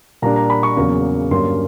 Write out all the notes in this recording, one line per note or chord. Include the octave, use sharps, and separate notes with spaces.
A#2 G3 A#3 D4 A#5
A#5
B5
C#6
E2 C#3 F#3 A#3
G2 D3 F#3 A#3 C#4 C6